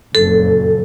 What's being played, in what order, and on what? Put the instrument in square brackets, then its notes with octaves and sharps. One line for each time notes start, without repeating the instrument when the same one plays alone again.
[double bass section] F#1 F2 A#2 [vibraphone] A4